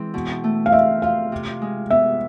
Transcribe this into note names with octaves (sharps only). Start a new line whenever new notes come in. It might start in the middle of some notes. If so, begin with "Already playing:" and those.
Already playing: E3 G#3 C4
B2
A3
F5
C4 E5
F4 F5
C3
G#3
B3 E5